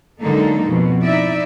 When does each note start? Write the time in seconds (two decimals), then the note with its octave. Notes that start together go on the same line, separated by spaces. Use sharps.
0.20 D3 F#3 G#3 A#3 D#4 A4
0.68 F2 B2
1.03 D#4 E4 D5 E5